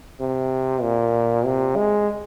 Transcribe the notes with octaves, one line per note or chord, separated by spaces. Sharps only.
C3
A#2
C3
G#3